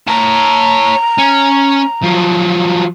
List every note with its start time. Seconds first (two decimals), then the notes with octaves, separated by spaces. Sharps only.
0.07 C#5 A5 A#5
1.18 C#4
2.03 F3 F#3